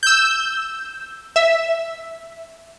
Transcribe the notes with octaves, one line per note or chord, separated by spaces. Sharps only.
E6 G6
E5